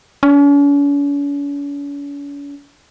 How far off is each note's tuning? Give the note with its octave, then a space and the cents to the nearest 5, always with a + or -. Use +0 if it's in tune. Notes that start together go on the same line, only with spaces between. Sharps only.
C#4 +45